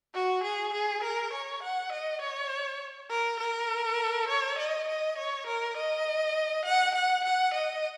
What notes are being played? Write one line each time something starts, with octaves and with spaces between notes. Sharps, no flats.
F#4
G#4
G#4
A#4
C#5
F#5
D#5
C#5
A#4
A#4
C#5
D#5
D#5
C#5
A#4
D#5
F#5
F#5
F#5
D#5